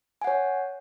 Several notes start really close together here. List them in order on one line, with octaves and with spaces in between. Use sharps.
G#5 F#5 C#5